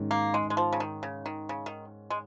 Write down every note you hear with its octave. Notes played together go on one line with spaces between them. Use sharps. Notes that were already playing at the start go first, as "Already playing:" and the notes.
Already playing: G#2 D#3 C#4
A#3
G#3
G#3
F3
C#3
D#3
C#3
D#3
C#3
D#3
G#3